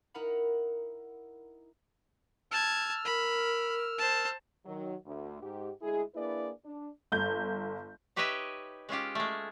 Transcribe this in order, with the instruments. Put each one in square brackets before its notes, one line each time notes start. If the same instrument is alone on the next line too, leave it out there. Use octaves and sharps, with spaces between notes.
[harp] D#4 E4 A#4 F#5 B5
[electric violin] A5 G#6 [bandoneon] E6 F6
[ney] A#4 [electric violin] B5
[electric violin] C5 A5
[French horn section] D#3 F#3
D2
G#2 G4
D2 G#3 E4 G#4
A#3 D4 E4 G#4 B4 D5
D4
[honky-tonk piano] G1 G6
[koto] D#4 G4 B4 C#5 D#5 E5
G#3 C#4 F4 G4
G#3 A3